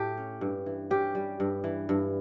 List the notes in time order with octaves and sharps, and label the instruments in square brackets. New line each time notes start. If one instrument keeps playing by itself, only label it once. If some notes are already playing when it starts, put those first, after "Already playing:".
Already playing: [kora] A2 G4 A4
C#4
G2
E3
C#4 G4
G3
G2
E3
G2